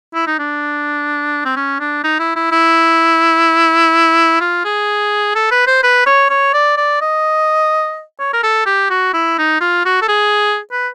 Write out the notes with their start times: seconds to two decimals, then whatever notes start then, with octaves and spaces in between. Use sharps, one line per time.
0.15 E4
0.27 D#4
0.39 D4
1.45 C4
1.56 C#4
1.80 D4
2.04 D#4
2.19 E4
2.36 E4
2.52 E4
4.41 F4
4.64 G#4
5.35 A4
5.51 B4
5.67 C5
5.83 B4
6.06 C#5
6.30 C#5
6.54 D5
6.77 D5
7.01 D#5
8.20 C#5
8.33 A#4
8.43 A4
8.66 G4
8.90 F#4
9.14 E4
9.38 D#4
9.61 F4
9.85 F#4
10.02 A4
10.09 G#4
10.72 B4